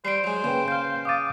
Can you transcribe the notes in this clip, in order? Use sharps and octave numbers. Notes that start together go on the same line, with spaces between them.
G3 C5 C7 D7
F#3 G#3
C#3 A#3 B4 G5
F5 F6 G6
F5 D6 D#6 A6 D#7